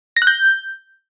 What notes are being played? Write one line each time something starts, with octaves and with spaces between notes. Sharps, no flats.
A#6
F#6
G6